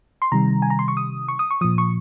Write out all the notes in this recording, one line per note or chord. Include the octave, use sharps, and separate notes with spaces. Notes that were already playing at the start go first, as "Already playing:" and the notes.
C6
C3 D#3 G3 A#5
G#5
A#5
C6
C#6
D#6
C#6
D#6
C#6
A#2 F3 D#6
C#6